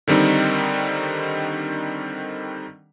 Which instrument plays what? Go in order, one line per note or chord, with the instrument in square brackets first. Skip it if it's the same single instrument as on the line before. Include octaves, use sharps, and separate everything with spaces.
[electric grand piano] D3 D#3 G3 C4 D#4